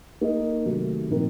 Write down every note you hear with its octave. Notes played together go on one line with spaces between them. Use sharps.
A#3 D#4 A#4 D#5
C3 D#3 F#3 A3
A#2 F3 C4 D#4 A#4